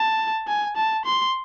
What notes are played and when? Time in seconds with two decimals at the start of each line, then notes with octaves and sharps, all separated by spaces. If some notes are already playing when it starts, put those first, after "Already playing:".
Already playing: A5
0.48 G#5
0.76 A5
1.05 C6